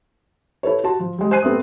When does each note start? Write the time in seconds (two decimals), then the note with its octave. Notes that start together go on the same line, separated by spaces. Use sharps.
0.63 E4 A4 B4 C#5
0.84 F#4 A5 C6
1.00 F3
1.18 G3 G#3
1.31 C5 G#5 F#6 C7 D#7
1.43 A3 B3 C4 E5 D#6